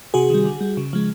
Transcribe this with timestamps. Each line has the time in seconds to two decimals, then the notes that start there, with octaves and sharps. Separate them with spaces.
0.14 C3 F#4 G#4
0.30 D#3 G3
0.45 D3
0.61 G3
0.77 C#3
0.93 F3 G#3